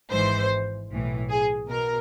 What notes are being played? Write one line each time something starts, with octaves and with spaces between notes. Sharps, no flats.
G#1 G#2 E3 C5
B1 A2 E3
G#4
B2 A#4